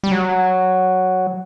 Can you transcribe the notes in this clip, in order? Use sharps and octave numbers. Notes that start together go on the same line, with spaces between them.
G3
F#3